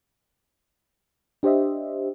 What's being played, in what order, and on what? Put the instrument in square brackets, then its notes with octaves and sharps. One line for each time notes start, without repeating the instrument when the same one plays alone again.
[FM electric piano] D4 G4 C5 D#5 E5